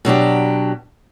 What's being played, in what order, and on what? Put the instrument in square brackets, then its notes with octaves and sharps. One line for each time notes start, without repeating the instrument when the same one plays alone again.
[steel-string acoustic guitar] B2 F#3 D4 G4